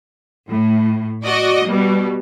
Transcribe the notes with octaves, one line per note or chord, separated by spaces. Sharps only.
A2
F#4 D5 D#5
B2 G3